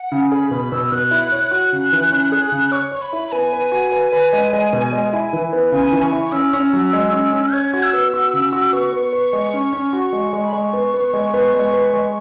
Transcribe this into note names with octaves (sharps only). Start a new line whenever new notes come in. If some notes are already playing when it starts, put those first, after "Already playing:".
Already playing: F#5
C#3
G#4 B5
B2 B5
B2 E6
B2 F#6
E4
C#5
F#4 F#6
C#3
E3
C#4
G#4
C#3
C#5 C#6
C#5 C#6
B5
E4
B5
B3 G#5
B4
F#4
B4
B4
G#3
G#3
B2
G#3
E4
E3
B3
C#3 G#5
E3
C#6
E4
C#6
C#4 E6
C#4
F#3
G#3
C#4
C#4
C#5 G#6
F#4
E6
B3
F#4
C#3
F#4
B3 C#6
B3
B4
G#3
C#4
C#4
F#4
G#3
G#3
B5
G#3 C#6
B3
B3
G#3
B3
G#3
B4
G#3